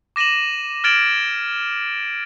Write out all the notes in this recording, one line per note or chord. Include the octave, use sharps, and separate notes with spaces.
D6 A#6 D#7 E7 F#7
F6 G#6 A6 D7 E7 F#7